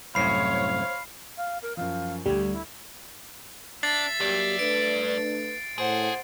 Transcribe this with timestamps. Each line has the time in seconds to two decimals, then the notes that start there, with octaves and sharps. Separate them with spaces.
0.15 C2 F#2 A2 C5 C#5 F5 B5 C7
1.38 F5
1.63 A#4
1.77 F#2 F3 F5
2.26 D2 G3 G4 G#6
2.52 E4
3.83 D4 E5 A6 C7
4.20 G2 F#3 A#3 G4 D5
4.59 A3 D4 B4 D7
5.78 A2 G#4 C5 F#5